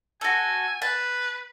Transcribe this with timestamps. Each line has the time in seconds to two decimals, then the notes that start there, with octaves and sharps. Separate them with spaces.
0.21 F#4 A4 G#5
0.82 B4 A5